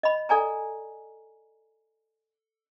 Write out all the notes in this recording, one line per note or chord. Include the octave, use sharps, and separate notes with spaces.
D#5 B5
A4 D5 G#5 A#5